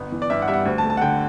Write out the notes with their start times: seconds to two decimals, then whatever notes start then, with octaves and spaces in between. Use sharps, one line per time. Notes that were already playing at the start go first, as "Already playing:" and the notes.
Already playing: G1 B3
0.12 E3
0.22 D5
0.30 G2 E5
0.42 F#5
0.48 G3 E5
0.54 F#5
0.66 D2
0.78 A5
0.84 A3
0.90 A5
0.97 F#5
1.01 D3 G5